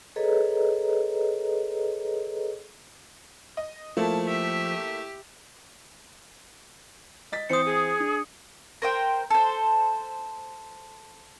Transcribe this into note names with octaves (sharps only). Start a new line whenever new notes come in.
G#4 A4 B4 C#5 D#5 A#5
D#5
F3 A3 A#3 E4 A5
G4 E5
D#5 A6 B6
E3 C4 C5 D#6 C#7
G#4
D4
A#4 C5 G5
A4 C5